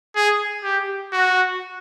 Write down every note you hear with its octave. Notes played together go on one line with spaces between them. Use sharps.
G#4
G4
F#4